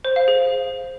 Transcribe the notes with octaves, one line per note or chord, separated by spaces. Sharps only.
C5
F5
G#4